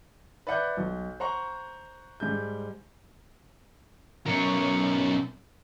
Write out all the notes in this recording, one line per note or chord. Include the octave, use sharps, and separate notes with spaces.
B4 D5 E5 F#5 F#6 G6
B1
C5 F#5 A#5 C#6
G#2 G3 G6
B1 C#4 A#4 C#5